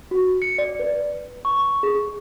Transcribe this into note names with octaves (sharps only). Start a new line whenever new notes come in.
F#4
C#7
D5
B4
C#6
G#4